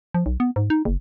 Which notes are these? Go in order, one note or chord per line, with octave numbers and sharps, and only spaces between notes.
F3
B1
B3
G#2
D#4
F#1